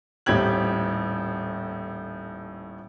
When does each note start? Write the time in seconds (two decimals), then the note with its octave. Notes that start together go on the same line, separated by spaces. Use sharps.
0.26 D#1 A2 C4 G4 G#6 F#7